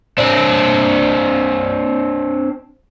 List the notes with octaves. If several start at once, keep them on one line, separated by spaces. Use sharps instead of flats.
C4 D4